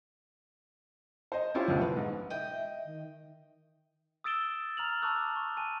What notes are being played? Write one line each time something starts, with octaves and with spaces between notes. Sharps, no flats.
C5 D#5
C#4 E4 F4 G4 C5
F#1 D2 B2 F3
E3 B4
G#2
D#5 E5 G5
D#3
D#6 E6 A6 D7 E7 G7
A#5 F6 F7 F#7
A5 A#5 C#6 D6 E6 F#6
C#6
G#5 A5 D#7